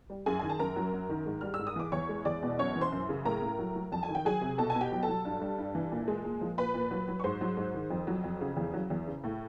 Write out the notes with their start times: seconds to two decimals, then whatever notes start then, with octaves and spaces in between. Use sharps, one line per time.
0.10 G3
0.26 F#2 G#4 G#5
0.39 D#3 G#5
0.49 A5
0.59 F#2 A#4 A#5
0.76 F#3
0.93 F#2
1.09 D#3
1.26 G#2
1.41 G3 F6
1.54 E6
1.59 G#2
1.67 D#6
1.76 E3 D6
1.92 E2 C#5 C#6
2.09 G#3
2.25 E2 D5 D6
2.43 B2
2.59 F#2 C#5 C#6
2.76 E3
2.81 C5 C6
2.92 F#2
3.09 C#3
3.25 A2 A#4 A#5
3.42 A2
3.59 F#3
3.75 F#3
3.92 F2 A5
4.03 G#5
4.08 D#3
4.15 G5
4.25 F#3 G#4 G#5
4.41 C3
4.58 B2 A4 A5
4.70 G#5
4.75 B2
4.81 G4 G5
4.92 F#3
5.03 A4 A5
5.08 F#3
5.25 G2
5.41 G3
5.58 G2
5.75 E3
5.91 A#2
6.08 G#3
6.25 A#2
6.41 F3
6.58 A#2 B4 B5
6.74 A#2
6.91 F#3
7.08 F#3
7.20 C#6
7.24 G#2 C5 C6
7.41 F#3
7.57 G#2
7.74 D#3
7.91 F2
8.07 F#3
8.24 F2
8.41 C#3
8.57 E2
8.74 F#3
8.90 E2
9.07 C#3
9.24 A2